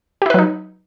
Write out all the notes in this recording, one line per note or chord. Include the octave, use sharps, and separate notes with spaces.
F#3 D#4 E4 G4 B4